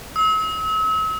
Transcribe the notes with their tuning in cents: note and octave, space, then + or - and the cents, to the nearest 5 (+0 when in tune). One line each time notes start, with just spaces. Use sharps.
E6 -40